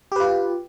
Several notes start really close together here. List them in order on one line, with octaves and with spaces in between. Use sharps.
G4 B4 F4